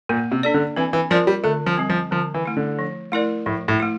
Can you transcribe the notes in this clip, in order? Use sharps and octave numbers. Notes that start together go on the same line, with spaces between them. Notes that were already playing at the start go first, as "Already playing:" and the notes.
A#2 A#3
C3
D4 A4 D5
D3
E3 C4
E3
F3 F4 A#4 D5
G3
D3 A3
F3
G3 C4
F3
D3 F3
E3
A3 E4
D3
F3
A3 E4 A#4 D5
A2 F3
A2
A3 E4